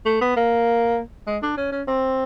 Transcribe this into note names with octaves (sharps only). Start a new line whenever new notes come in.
A3
B3
A#3
G#3
D4
C#4
C#4
C4